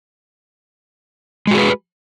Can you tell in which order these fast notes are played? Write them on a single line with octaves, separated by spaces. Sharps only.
G#3 F#4 G#4 B4